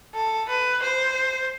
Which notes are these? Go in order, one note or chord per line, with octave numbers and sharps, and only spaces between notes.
A4
B4
C5